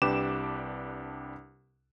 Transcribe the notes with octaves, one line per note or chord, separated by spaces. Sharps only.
C2 D4 G4 B4 D6 E7